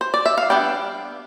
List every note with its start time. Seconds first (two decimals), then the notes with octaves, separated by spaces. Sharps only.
0.01 C5
0.14 D5
0.26 E5
0.38 F5
0.50 G3 B3 D4 G5